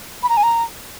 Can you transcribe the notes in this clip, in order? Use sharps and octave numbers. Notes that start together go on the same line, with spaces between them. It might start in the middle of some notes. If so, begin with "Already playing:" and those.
B5
A#5
G#5
A#5